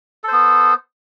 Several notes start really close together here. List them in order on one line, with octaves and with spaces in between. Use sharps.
A4 C5 B3